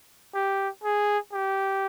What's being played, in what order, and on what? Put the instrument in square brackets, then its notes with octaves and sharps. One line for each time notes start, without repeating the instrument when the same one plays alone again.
[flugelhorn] G4
G#4
G4